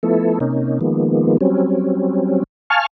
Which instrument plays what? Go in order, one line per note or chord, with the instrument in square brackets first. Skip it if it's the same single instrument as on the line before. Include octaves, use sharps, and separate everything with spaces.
[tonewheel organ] F3 A3 B3 E4 A4
C3 A#3 C#4 D#4
D#3 F3 G#3 A#3 B3
F#3 G3 C4 C#4
F5 G#5 A5 C#6 F6